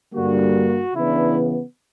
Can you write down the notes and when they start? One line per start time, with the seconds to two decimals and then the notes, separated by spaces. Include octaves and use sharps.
0.13 G2 D3 G3 A#3 F#4
0.95 C#3 E3 B3 D4 E4